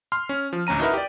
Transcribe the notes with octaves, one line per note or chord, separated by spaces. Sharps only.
C6 F6
C#4
F3
A1 D2 C#4 A#5 D#7
D#4 E4 F#4 A#4 B4 E5
G4 D5